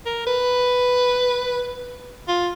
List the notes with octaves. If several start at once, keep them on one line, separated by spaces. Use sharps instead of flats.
A#4
B4
F4